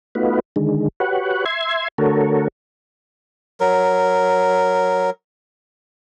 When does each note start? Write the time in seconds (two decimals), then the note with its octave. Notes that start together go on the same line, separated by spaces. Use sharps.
0.15 A3 B3 D#4 F4 F#4 B4
0.56 D3 D#3 G#3
1.00 F#4 G4 B4 C#5 F#5
1.46 E5 C6 G#6
1.98 D3 A3 F#4 A4 A#4 C#5
3.60 F#3 A#4